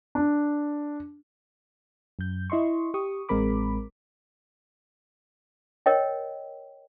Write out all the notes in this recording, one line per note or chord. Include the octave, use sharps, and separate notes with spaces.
D4
F#2 G6
E4 D#5 C6 C#6
G4 C#6 D#6
A1 G#3 C4 A#4 B5 D6
A#4 C#5 D#5 G5